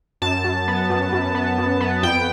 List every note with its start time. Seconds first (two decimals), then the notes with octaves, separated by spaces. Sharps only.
0.22 F#2 A5
0.44 F#2
0.68 B3
0.90 F#2
1.13 F#2
1.35 B3
1.58 F#2
1.81 B3
2.03 F2 G5